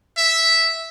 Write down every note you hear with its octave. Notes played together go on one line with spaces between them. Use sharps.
E5